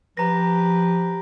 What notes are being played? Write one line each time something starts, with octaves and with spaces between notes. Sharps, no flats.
F3 G4 B4 A#5 A#6